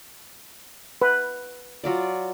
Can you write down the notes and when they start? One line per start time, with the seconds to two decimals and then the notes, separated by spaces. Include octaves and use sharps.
1.02 B4
1.84 F#3 F4 D5